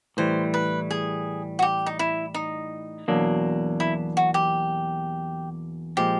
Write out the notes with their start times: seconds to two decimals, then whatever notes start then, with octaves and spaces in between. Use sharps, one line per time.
0.17 A2 E3 G3 C5
0.54 B4
0.91 G#4
1.59 F#4
1.62 G4
1.86 D#4
1.99 E4
2.35 D#4
3.08 E2 B2 F#3 A#3 D4
3.80 E4
4.17 F#4
4.34 G4
5.97 A#2 F3 G#3 G4